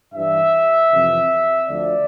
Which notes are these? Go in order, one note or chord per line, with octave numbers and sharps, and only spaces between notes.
G2 E3 E5
F2 C3 E3
D2 D3 F3 D5